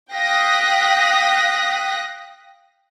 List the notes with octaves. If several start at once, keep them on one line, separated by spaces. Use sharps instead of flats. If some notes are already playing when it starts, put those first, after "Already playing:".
F5 G5 D#6 F#6 A#6 B6